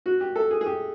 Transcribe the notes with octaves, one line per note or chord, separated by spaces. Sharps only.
F#4
G4
A4
G#4
G#4
G4